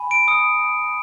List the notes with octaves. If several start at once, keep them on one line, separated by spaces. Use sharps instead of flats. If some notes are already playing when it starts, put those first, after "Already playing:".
Already playing: G#5 B5
D7
D#6 C#7